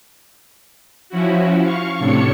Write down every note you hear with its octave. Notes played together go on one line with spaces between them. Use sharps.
F3 C#4 E4 F#4
F5 C#6
A2 C3 D4 A4 C#5 C#7